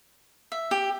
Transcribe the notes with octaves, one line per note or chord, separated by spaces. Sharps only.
E5
G4